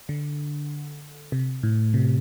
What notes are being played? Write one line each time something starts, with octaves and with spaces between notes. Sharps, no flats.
D3
C3
A2
C3